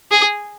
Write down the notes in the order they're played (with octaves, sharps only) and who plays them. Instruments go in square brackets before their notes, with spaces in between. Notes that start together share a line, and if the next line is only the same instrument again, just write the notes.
[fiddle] G#4